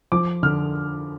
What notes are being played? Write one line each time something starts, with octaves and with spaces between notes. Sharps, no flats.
F3 D6
D3 F6